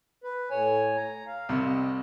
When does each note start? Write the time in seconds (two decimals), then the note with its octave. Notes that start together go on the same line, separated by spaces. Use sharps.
0.24 B4
0.50 A2 C#5 G#5
0.96 A#5
1.27 F5
1.49 C2 C3
1.65 D#5